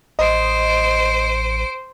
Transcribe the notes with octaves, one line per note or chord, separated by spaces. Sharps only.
A1 C5 D#5 D7